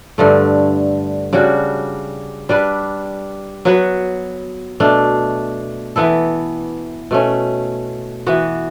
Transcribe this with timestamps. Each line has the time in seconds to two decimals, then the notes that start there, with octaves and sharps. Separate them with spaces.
0.18 G2 D3 A3
1.33 C#3 G3 D4 F#4
2.49 G3 D4 G4 B4
3.65 F#3 B3 F#4 B4
4.80 B2 A3 D4
5.96 E3 B3 E4 A4
7.11 B2 A3 C#4
8.27 E3 B3 F#4